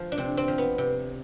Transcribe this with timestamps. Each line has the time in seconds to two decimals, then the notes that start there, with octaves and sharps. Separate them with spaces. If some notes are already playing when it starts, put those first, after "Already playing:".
Already playing: F3
0.12 D4
0.18 C3 C4
0.37 C4
0.48 F3
0.58 B3
0.78 C3